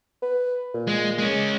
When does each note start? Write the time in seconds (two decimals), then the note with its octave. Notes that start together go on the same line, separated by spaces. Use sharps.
0.22 B4
0.74 A#2
0.87 G#3
1.18 G#3 C#4